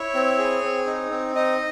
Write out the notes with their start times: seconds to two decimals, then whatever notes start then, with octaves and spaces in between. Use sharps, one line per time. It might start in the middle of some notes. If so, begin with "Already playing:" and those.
Already playing: E4 C#5
0.15 C4
0.38 G#4
0.63 C4
0.87 D#4
1.11 C4
1.35 D#4 D#5